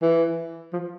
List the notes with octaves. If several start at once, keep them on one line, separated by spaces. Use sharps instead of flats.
E3
F3